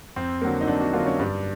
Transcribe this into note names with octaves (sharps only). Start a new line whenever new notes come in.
F2 C4
D3 F#3 A#3
D#4
F2 D4
F#4
D3 F#3 A#3 F4
C#4
G2 D4